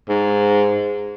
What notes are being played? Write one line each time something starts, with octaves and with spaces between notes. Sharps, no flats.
G#2